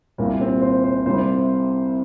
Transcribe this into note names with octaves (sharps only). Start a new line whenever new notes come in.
C2 A#2 G3 A#3
C4
C5
C5
C2 C3 G3 C5